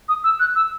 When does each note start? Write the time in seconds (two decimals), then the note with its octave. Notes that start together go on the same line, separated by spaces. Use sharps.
0.09 D#6
0.24 E6
0.40 F#6
0.55 E6